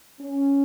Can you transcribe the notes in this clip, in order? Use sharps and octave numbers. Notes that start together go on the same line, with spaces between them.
C#4